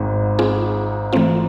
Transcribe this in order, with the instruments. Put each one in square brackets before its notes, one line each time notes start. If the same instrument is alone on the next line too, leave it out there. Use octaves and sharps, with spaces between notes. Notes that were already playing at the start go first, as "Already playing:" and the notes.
Already playing: [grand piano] G#1 G#2
[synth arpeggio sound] C4 F4 G#4
E3 A3 C4 F4